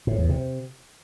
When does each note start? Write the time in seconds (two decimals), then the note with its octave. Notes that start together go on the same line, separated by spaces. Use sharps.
0.07 A2
0.18 E2
0.29 C3